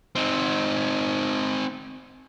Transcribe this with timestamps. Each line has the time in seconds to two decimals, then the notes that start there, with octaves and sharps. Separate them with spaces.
0.15 C4 D#4